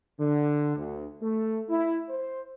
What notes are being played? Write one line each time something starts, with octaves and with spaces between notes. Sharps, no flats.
D3
D2
A3
E4
C5